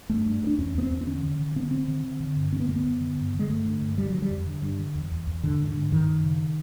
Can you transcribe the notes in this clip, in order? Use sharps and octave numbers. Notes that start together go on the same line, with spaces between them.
G2 A3
G2
G2
D4
E2 C#4
E2 B3
C4
E2
C4
D3 C#4
D3
D3
D3 C4
B3
D3 C4
D3
D3
D3
G2
D3 C4
B3
F#2 A#3
B3
F#2
D3
G2
D3
G#3
G2 A3
D3
G2
D3 G3
D3 F#3
G3
F2
D3
G2
D3
E2
E2
E2
G#2 D3
G#2
D3
G#2
F#2 D#3
F#2
C#3